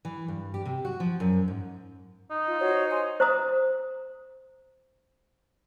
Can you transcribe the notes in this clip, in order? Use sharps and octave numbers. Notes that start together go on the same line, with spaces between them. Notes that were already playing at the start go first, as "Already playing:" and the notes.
E3
G2
G4
C3
F#4
F3
F#2
G#2
D#4
F4
F#4 C5 C#5
G#5 C6
C5 A#5 D#6